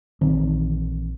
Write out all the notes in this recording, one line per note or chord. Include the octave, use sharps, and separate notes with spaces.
A#1 D#3 E3 C4